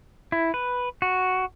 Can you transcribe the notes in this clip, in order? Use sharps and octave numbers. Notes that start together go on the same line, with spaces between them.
E4
B4
F#4